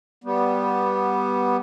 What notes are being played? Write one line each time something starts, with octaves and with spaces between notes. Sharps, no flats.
G3 B3